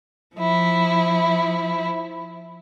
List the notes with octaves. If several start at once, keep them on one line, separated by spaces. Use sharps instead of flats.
F3 E4